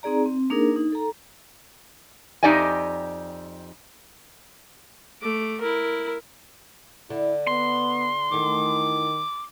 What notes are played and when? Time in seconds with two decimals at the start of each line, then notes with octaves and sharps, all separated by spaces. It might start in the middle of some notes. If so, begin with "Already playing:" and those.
0.03 C4 D#4 G#4 D5 A#5
0.26 C4
0.50 A#3 D4 D#4 G#4 A#4
0.76 D#4
0.92 A4 A#5
2.43 F2 D#4 G4 D5 D#5 G#5
5.21 A3 D6
5.61 E4 A#4
7.10 D3 E4
7.47 B3 C6
8.32 E2 D#3 A3 D6